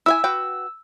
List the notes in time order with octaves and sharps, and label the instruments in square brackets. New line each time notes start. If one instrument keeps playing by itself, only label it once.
[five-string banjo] E4 E5 G#5 [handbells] E6
[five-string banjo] F#4 B4 G5